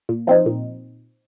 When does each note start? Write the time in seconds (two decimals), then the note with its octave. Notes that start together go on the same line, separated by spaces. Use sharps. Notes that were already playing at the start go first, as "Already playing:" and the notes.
0.09 A#2
0.27 F3 C4 D#4
0.46 A#2